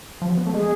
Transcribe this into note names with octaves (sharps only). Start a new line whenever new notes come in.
F3
F#3
B3
A3
G#3 G#4